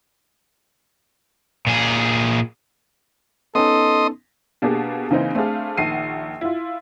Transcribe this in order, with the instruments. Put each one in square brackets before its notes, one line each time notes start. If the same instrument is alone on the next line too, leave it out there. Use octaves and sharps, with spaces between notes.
[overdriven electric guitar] A#2 G#4
[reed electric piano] B3 C#4 D#4 [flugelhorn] A4 [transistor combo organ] D#5 C6 D#6
[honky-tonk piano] B2 A#3 D4 G4 G#4
C#3 E3 A#3 C4 D#4
A3 C4 D4 G#4 F5 A5
A#1 D#3 F#5 A5 C7 D#7
E4 F4